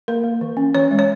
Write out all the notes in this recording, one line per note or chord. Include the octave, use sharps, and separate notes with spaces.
A#3 A#4
A#3
E3
C#4
E3 C#5
G#3
C#5